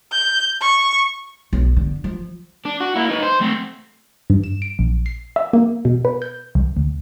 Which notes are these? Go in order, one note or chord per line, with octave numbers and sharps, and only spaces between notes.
G6
C#6
B1
D3
F3
D4
F#4
A#3 E4
D#4 B4
C5
A3 C4
G2
E7
D7
A#1
C7
E5
A#3
B2
B4
G6
C2
D2